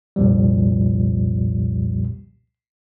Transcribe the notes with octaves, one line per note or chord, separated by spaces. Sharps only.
C2 F2 A#2 F3 G3